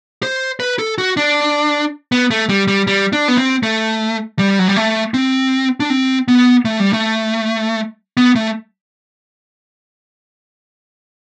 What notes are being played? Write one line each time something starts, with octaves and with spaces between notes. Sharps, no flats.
C5
B4
A4
F#4
D4
B3
A3
G3
G3
G3
D4
B3
C4
A3
G3
F#3
G3
A3
C4
D4
C4
B3
A3
G3
A3
B3
A3